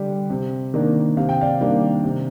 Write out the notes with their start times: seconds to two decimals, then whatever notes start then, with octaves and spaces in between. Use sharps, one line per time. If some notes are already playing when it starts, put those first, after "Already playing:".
Already playing: D3 G3 D4
0.30 C3
0.74 D#3 A#3 D4
1.17 C3 F5
1.29 G5
1.41 D5 F5
1.61 D#3 G3 A#3 D4
2.04 C3